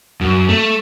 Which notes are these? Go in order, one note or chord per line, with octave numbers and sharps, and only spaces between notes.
F#2
A3